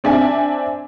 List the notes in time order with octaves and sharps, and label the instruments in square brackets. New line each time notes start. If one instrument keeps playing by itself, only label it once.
[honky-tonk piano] C4 D4 E5 G#5